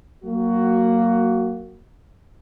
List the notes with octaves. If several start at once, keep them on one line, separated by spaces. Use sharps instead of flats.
F#3 A#3 F#4